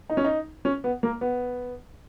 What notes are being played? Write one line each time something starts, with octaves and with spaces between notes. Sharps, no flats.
D#4
C#4
D#4
C#4
B3
A#3
B3